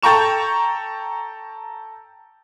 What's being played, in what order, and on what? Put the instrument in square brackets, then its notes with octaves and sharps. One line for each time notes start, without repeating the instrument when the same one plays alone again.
[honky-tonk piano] A4 G5 A#5 C#6 E7